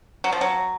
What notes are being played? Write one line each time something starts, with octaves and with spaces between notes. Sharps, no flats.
F#3
F3
F#3